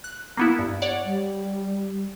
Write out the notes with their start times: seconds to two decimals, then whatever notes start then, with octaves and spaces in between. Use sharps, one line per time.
0.04 F#6
0.37 A#3 B3 E4
0.59 G2
0.82 C#5 D5 F#5
1.05 G3